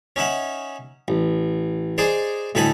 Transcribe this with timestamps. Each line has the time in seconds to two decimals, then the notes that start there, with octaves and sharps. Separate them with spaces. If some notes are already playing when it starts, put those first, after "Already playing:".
0.16 C#4 D#4 E5 F#5
1.08 A1
1.98 D#4 G#4 C5 D5
2.55 D2 A2 D#4 A4 G#5 B5